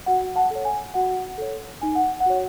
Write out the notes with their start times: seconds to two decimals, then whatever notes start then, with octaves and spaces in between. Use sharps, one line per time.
0.06 F#4 F#5
0.36 F#5 A5
0.50 A4 C#5
0.65 G#5
0.94 F#4 F#5
1.38 A4 C#5
1.82 D#4 G#5
1.95 F#5
2.20 F#5
2.26 F#4 C#5